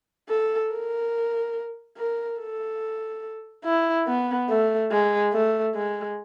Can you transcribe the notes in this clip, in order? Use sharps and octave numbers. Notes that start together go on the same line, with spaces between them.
A4
A#4
A#4
A4
E4
B3
A3
G#3
A3
G#3